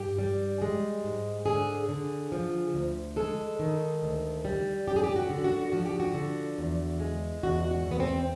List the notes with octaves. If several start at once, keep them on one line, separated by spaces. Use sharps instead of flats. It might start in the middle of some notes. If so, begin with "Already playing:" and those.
Already playing: G2 G4
G3
G#3
G#2
D3 G#4
D3
F3
D2
G#3 A4
D#3
D2
G3
F#2 G4
G#4
G4
F#4
D3
F#4
F3 F#4
G4
F#4
D3
E2
G#3
E2 F#4
F#4
E2
B3
C4